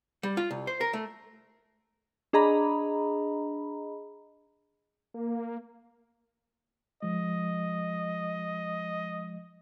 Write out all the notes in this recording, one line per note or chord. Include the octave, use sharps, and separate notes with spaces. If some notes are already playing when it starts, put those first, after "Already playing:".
G3
F4
C2
C5
A#4
A3
D4 G#4 D#5 A#5 B5
A#3
F3 G#3 D#5